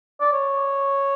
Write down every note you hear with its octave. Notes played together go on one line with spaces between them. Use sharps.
D5
C#5